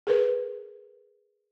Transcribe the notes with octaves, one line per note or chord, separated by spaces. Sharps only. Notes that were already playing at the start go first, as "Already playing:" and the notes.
G#4 A#4 B4